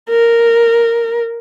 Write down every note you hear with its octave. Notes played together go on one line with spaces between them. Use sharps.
A#4